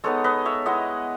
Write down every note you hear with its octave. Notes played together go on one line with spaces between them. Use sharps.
G#3 B3 D#4 A4 C#5
B4 D#5
C#5 E5
G#3 B3 E4 D#5 F#5